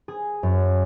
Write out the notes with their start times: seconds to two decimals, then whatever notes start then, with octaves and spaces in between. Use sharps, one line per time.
0.08 G#4
0.43 F#2